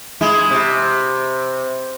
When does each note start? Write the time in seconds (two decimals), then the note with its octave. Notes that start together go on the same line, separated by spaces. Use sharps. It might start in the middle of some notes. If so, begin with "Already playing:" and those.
0.21 G#3 E4
0.51 C3